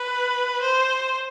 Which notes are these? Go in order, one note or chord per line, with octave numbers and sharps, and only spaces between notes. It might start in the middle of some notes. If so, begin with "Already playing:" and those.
Already playing: B4
C5